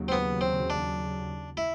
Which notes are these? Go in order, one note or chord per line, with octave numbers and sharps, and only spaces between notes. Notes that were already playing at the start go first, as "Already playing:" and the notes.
Already playing: D#2 C#3 F#3
C4
B3
C4
D4
E4